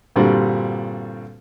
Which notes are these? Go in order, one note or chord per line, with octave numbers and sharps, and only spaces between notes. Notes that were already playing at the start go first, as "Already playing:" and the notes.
G2 A#2 D3 G3 C4 F#4